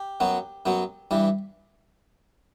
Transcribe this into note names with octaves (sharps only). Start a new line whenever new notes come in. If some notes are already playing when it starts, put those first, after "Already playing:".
Already playing: G4
F#2 F#3 B3
F#2 F#3 B3
G2 E3 G3